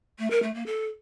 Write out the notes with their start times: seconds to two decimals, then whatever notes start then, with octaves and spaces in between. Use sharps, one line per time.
0.19 A3
0.31 A#4
0.43 A3
0.54 A#3
0.66 A4